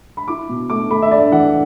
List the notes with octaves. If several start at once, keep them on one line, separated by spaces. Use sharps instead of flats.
B5
E4 D6
B2
A3 D6
A3 B5
E5
D4 D5
E3 F#5